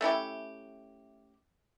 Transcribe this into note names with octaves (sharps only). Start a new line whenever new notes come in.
A3 C#4 E4 G4